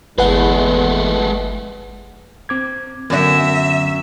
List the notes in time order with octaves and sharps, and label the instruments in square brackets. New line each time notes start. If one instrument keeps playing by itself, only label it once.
[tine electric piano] G1 [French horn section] E2 [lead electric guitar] G#3 A3 [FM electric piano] B4 F#5
[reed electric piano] C4 D6 G#6
[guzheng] F#2 F#4 [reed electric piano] D3 F#3 B3 [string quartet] E5